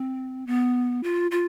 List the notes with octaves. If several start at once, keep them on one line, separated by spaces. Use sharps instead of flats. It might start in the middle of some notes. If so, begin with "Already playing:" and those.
Already playing: C4
B3
F4
F4